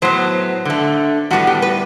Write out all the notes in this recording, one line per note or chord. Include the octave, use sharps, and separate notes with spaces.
A2 F#3 B3 C5
D3 A3
A2 G3 B3 F#4
G4
B4